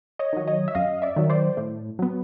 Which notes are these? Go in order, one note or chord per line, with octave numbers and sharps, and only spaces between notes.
C#5 D#5
D#3 F#3
C#5 D#5
E5
F#2 D#5 F5
D5 E5
D#3 F#3
C5 D5
A2
F#3 B3